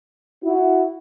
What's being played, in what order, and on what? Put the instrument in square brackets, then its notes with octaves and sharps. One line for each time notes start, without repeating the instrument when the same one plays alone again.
[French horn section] E4 F#4